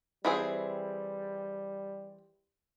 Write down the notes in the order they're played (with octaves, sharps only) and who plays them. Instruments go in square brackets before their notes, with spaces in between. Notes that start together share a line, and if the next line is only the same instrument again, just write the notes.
[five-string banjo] E3 C4 G#4 [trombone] G3